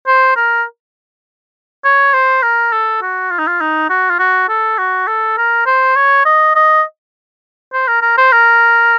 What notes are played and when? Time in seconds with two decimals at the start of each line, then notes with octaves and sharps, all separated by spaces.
0.07 C5
0.36 A#4
1.84 C#5
2.13 C5
2.42 A#4
2.72 A4
3.02 F#4
3.31 F4
3.39 D#4
3.47 F4
3.61 D#4
3.90 F#4
4.10 F4
4.19 F#4
4.49 A4
4.78 F#4
5.07 A4
5.37 A#4
5.66 C5
5.96 C#5
6.25 D#5
6.55 D#5
7.73 C5
7.87 A#4
8.02 A#4
8.18 C5
8.32 A#4